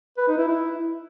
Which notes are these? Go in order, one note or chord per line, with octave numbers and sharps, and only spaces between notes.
B4
D#4
E4
E4